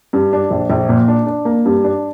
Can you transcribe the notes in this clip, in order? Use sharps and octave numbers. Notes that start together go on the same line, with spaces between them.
G2
D4
A#1
A#1
A#2
D4
D4
A#3
G2
D4